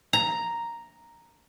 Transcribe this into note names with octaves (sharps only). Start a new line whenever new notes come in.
A#5